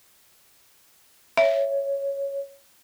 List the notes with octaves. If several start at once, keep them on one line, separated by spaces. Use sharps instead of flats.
C#5 E5